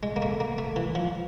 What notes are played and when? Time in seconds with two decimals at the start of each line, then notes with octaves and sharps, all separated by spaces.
0.03 G#3
0.16 A#3
0.22 A3
0.40 A#3
0.58 A3
0.76 E3
0.95 F3